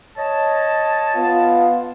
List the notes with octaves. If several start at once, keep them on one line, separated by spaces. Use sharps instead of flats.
C#5 D#5 A5
B3 F4 F5